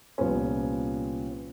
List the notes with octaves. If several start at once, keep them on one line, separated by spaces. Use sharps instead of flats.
C2 A#2 F3 B3 C#4